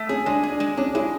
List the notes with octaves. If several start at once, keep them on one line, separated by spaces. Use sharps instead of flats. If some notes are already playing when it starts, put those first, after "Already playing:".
Already playing: A3
C#4 G#4
G#3 D4
G#4
D4
G#3
C#4 D4
G#3 E4 G#4